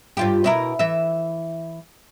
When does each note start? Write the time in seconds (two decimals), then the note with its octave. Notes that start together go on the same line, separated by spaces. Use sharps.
0.17 G2 F4 G4
0.44 B2 E4 A#4
0.79 E3 E5